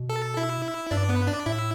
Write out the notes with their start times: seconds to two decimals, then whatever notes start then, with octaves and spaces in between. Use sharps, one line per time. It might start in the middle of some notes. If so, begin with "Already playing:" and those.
Already playing: B2
0.09 A4 A5
0.37 E4 E5
0.91 G2 D4 D5
1.09 B3 B4
1.27 D4 D5
1.46 A2 E4 E5